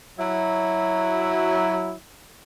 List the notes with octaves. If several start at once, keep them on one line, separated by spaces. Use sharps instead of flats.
F#3 E4